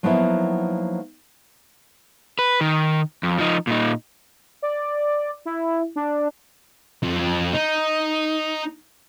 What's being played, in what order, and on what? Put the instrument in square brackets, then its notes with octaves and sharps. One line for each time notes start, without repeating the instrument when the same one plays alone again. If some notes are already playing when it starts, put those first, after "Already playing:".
[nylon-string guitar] F3 F#3 A#3 B3 D#4 E4
[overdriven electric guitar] B4
D#3
F2
F3 D#4
A#2 D#4
[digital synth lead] D5
E4
D4
[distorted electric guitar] F2
D#4